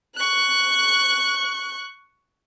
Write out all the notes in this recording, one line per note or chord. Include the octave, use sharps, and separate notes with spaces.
C#6 F#6